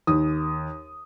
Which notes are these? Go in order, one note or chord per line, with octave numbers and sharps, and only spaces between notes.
D#2 D#6